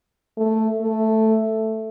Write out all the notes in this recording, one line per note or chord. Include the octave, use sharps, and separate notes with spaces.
A3
A3